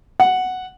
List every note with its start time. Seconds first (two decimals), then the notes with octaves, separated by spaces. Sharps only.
0.20 F#5